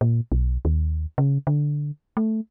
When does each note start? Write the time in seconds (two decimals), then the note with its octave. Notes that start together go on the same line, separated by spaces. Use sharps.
0.01 A#2
0.32 B1
0.65 D#2
1.18 C#3
1.47 D3
2.17 A3